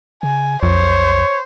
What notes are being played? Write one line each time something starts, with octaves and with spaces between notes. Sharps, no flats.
C#3 G#5
B1 F2 C5 C#5